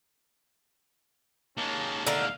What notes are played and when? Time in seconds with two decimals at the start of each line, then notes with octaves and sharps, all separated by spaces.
1.57 D#2 G#3 A#3 C#4 A5
2.07 D3 A3 A#4 F5